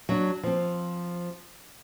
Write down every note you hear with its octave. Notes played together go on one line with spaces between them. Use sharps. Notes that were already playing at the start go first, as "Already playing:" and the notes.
F#3 D4
F3 C4